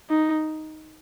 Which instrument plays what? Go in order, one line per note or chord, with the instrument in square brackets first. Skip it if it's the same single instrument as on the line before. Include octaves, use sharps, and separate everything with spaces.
[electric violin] D#4